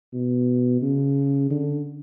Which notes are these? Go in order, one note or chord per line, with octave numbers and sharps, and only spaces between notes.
B2
C#3
D3